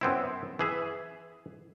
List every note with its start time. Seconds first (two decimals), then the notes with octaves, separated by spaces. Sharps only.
0.01 F#2 B3 C4 E4
0.59 E3 G#4 E5